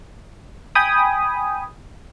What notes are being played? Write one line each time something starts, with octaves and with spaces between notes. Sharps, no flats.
G5 G#5 B5 D#6